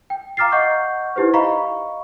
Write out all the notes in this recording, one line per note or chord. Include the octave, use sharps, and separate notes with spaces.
G5
F5 A#5 D6 F6 A6 C7
D#5 F#5 C#6 G6
D#4 E4 G4 B4 C5
D#5 F5 A#5 B5 C#6